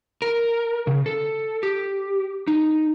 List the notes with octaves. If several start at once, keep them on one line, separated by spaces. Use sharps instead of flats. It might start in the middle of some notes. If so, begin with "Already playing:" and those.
A#4
C#3
A4
G4
D#4